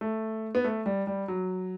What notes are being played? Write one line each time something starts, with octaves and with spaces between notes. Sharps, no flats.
A3
B3
A3
G3
G3
F#3